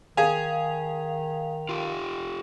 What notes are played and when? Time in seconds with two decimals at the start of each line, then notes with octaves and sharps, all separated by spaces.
0.17 D#3 G#4 F5 G#5 F7
1.69 F4 G4